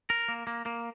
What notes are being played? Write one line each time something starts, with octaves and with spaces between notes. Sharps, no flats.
A#4
A#3
A#3
A#3